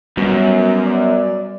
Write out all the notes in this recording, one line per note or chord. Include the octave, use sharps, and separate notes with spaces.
F#2 B2 G3 B3
D5